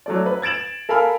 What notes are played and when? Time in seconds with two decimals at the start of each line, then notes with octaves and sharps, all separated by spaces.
0.06 F#3 A3 D5
0.26 B4
0.42 G#6 A6 D7 E7 F#7
0.89 A4 A#4 F5 G#5 B5 F6